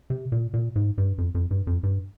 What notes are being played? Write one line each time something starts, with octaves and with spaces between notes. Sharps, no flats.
C3
A#2
A#2
G#2
G2
F2
F2
G2
F2
G2